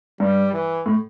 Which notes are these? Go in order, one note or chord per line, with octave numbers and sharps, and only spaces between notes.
G2 G3
E3
A2